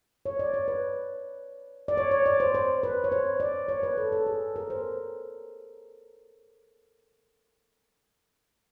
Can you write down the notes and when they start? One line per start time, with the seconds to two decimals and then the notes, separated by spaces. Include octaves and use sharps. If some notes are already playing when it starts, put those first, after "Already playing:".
0.26 C#5
0.39 D5
0.54 C#5
0.68 B4
1.88 D5
1.97 C#5
2.11 C#5
2.26 D5
2.40 C5
2.54 C5
2.83 B4
3.04 C#5
3.12 C5
3.40 D5
3.69 C#5
3.83 B4
3.98 A4
4.12 A4
4.27 G#4
4.56 A#4
4.70 C5